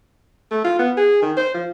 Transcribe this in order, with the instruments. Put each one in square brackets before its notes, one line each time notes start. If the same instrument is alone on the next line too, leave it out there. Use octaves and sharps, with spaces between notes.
[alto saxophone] A3
F4
B3
G#4
D#3
C5
F3